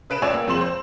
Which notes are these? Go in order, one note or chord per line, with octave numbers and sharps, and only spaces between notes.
C#3 B4 D7 E7
C#2 C#5 D5 G#5 E6 E7
A#3
F2 F3 G#3 C6 E7 F#7
C5